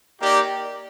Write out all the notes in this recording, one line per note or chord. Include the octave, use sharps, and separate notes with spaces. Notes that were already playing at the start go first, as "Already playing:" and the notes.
A#3 D#4 G4 D5